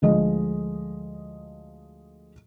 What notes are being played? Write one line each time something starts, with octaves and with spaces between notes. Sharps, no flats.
D2 F3 G#3 D#5